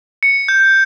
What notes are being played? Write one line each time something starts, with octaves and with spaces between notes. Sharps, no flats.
C#7
G6